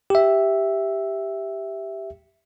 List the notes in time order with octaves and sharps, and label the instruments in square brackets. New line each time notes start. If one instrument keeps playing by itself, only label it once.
[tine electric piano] G4 E5